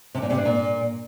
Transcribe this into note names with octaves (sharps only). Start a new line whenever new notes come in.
C3
A#2
C3
D4
A#2